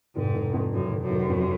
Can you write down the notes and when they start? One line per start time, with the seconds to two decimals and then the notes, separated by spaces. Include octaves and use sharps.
0.15 F1 G#2
0.34 F1
0.53 F2
0.72 F#2 C#3
0.91 F1
1.01 F#2
1.10 F1
1.29 F2